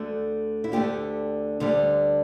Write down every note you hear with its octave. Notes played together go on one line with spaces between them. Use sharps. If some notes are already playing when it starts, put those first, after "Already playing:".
Already playing: D2 D3 A3
E4
D2 D3 A3 G4
D2 D3 G3